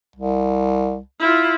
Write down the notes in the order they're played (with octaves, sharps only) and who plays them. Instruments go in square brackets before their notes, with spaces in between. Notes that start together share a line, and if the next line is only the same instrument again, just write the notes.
[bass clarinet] C2
[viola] E4 F4